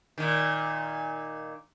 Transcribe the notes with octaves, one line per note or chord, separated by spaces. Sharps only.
A#2 D#3